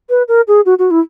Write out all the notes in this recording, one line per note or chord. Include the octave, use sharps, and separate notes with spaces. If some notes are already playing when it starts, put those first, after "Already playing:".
B4
A#4
G#4
F#4
F#4
E4